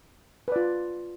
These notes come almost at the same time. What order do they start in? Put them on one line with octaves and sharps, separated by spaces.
B4 D5 F4